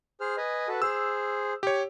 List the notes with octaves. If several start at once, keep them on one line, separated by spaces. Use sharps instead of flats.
G#4 C5 F6
B4 D#5 G#5
F#4 A4 B4
G#4 C5 E6
G4 C#5